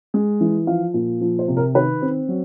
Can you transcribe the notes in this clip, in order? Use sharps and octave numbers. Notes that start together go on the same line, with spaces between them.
G#3
E3
F3 F5
A#2
F3
C5
C3
A#4
D#3 B4
C4
F#3